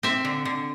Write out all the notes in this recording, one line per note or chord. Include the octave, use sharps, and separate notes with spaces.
C4 E5
D3
D3